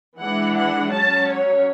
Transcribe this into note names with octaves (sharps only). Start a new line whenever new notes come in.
E3 G#3 D4 F#5
F#5
F#3 C#4 A5
C#5